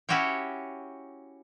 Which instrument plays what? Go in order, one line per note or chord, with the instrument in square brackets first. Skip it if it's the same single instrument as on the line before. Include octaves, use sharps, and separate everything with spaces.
[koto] C#4 E4 F#4 G4 C#5 G5